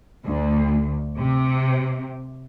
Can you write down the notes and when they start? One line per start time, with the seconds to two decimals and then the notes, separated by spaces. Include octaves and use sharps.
0.25 D2
1.18 C3